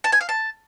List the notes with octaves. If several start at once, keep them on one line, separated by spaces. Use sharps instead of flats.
A5
G#5
F5
A5